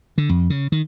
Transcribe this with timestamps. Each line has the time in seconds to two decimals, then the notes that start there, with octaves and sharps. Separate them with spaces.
0.18 D3
0.29 F2
0.50 C#3
0.72 D#3